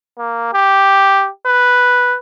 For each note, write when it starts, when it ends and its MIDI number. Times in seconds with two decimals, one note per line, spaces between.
0.19 0.51 58
0.53 1.28 67
1.46 2.16 71